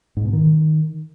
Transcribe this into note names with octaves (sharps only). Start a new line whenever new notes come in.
G#2
B2
D#3